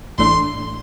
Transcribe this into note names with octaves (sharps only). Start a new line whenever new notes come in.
A1 A2 A3 D4 C6